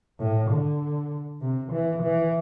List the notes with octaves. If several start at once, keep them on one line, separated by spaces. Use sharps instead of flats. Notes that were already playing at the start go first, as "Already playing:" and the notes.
A2
D3
C3
E3
E3